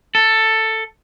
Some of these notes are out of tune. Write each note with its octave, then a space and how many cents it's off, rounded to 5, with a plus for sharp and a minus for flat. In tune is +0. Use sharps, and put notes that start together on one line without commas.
A4 +10